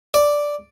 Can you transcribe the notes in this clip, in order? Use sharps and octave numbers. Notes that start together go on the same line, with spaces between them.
D5